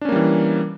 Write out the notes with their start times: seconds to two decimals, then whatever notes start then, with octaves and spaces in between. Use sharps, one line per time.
0.01 D4
0.05 C#4
0.09 A#3
0.12 G3
0.16 E3